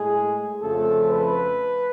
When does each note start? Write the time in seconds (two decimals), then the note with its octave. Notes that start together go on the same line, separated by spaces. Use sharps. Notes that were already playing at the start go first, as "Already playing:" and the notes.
Already playing: A2 G#3 G#4
0.62 F2 C#3 F3 A3 A4
1.11 B4